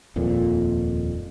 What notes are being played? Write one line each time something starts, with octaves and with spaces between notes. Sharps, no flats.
D#1 F2 A#2